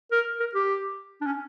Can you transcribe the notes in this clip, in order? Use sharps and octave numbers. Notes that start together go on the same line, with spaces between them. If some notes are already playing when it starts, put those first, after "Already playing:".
A#4
A#4
G4
D4
C#4